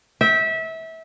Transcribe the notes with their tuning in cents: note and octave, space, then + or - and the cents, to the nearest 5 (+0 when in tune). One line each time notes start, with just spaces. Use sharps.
E5 -25 G5 +0